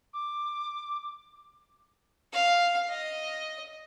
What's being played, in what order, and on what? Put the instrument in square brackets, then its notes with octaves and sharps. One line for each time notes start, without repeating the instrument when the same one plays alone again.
[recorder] D6
[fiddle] F5
D#5